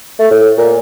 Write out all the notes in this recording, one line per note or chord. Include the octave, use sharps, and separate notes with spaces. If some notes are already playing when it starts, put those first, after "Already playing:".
A3
A2
A#2